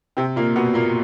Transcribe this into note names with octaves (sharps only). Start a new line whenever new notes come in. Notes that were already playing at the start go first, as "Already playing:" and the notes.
C3 C4
A#2 A#3
B2 B3
A#2 A#3